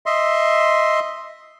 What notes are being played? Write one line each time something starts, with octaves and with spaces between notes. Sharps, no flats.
D#5 E5 C6